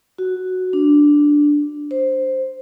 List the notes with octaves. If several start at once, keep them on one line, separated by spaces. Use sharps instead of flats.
F#4
D4
C5